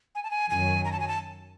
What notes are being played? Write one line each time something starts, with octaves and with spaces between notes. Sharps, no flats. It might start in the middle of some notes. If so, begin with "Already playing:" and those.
G#5
A5
G#5
F#2 D#3 F#3 G#5
A#5
A5
G#5
A5